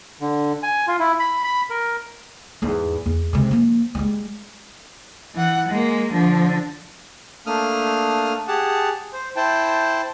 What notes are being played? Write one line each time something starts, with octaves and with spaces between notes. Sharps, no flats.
D3
G#5
F4
E4
B5
B5
A#4
E2 G#2
E2
C3 G#3
F3 A#3
G3 G#3
E3 F#5
G#3 A#3
D3 F3
A3 A#3 D4 D#6 F6
G4 G#4 F#5 A5
C5
E4 C5 G5 A5